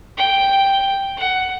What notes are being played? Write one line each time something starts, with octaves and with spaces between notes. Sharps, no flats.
G5
F#5